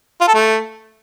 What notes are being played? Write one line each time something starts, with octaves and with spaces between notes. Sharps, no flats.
F4
A4
A3